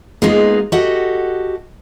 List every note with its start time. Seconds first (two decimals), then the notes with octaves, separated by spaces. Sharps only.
0.22 G#3 A#3 B3 D#4 F4 G#4
0.72 F#4 G4 A4 D#5 F#5